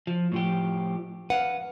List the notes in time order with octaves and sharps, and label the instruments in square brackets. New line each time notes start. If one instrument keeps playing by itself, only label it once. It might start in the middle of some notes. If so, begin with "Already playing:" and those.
[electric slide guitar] F3
A2 F3 G4
[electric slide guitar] B4 F5 [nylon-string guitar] F#5